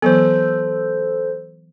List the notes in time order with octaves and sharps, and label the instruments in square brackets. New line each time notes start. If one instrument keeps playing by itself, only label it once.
[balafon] E3 F#3 B3 [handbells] A4 C5